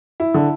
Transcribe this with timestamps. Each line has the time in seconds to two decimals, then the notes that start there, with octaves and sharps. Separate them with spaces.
0.20 E4
0.34 D3